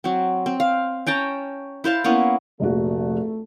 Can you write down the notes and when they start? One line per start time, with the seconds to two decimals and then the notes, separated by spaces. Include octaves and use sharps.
0.04 F#3 C4
0.46 C4
0.60 F5
1.06 C#4 G5 A5 A#5
1.84 E4 C5 F5 A5
2.04 A#3 B3 C#4 E4
2.60 F1 A#1 A3 F#4